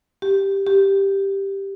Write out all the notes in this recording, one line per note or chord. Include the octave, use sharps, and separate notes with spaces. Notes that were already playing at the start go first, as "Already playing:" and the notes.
G4
G4